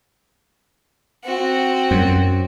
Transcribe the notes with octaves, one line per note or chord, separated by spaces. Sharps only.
C4 F#4
F#2